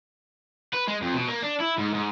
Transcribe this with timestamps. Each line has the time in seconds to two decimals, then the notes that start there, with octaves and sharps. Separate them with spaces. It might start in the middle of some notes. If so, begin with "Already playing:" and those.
0.73 B4
0.88 G#3
1.02 F2
1.14 B2
1.28 A#3
1.42 D4
1.60 E4
1.78 G#2
1.94 G#2